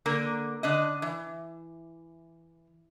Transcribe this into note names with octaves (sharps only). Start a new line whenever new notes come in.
D3 A#3 A#4
D3 D4 D#5
E3